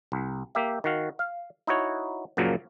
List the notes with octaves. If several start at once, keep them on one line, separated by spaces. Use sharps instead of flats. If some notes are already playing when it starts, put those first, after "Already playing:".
C2
A#3 G4 E5
D#3 F#4 F5
F5
D#4 E4 F#4 C#5
F#2 A#2 C#3 F3 F#3 A#3